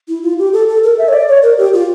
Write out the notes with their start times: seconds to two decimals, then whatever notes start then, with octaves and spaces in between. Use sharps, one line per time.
0.08 E4
0.23 F4
0.39 G4
0.53 A4
0.68 A4
0.84 A#4
0.98 E5
1.08 C#5
1.13 D5
1.28 C#5
1.43 A#4
1.58 G4
1.73 F4